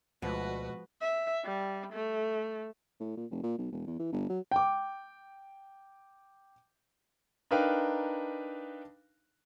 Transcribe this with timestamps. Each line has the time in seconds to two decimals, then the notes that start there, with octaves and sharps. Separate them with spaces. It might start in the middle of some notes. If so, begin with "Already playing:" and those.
0.22 D2 B2 F3 G#3 F#4 B4
1.01 E5
1.45 G3
1.92 A3
3.00 A2
3.17 A#2
3.31 F1
3.43 A#2
3.58 B1
3.72 E1
3.87 E2
3.99 E3
4.12 G1
4.30 F#3
4.51 G5 D6
7.51 D4 D#4 A#4 B4 F5 G5